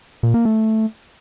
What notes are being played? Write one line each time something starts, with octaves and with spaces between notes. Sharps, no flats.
A#2
A#3
A3